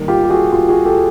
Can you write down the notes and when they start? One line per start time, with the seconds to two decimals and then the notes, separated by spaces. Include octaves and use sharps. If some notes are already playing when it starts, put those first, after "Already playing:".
Already playing: D#3 G3 A#3
0.08 F4 G4
0.24 G4
0.30 F#4 G#4
0.52 F4 G4
0.69 F#4 G#4
0.85 G4 A4